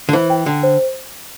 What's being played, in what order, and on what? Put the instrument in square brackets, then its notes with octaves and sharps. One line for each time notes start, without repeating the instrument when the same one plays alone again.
[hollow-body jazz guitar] D3
[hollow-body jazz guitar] E3 [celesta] C5
[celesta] G5
[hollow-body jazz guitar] D3 [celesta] G5
[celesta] C5